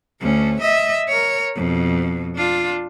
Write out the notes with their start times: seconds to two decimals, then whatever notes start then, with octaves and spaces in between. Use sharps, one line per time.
0.21 D2 C#4
0.61 D#5 E5
1.09 A#4 C#5
1.56 F2 B2
2.36 D4 F4